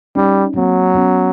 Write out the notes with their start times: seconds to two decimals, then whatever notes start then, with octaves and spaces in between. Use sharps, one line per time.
0.16 G3 C#4 D#4
0.56 F#3 A#3 C4
0.96 B3 C#4